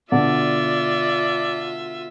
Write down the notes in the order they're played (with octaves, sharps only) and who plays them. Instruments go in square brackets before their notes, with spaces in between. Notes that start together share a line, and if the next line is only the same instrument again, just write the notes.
[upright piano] B2 D3 [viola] F4 E5 [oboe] D5